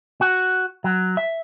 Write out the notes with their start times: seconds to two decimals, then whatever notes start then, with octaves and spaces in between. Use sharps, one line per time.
0.21 F#4
0.84 F#3
1.17 E5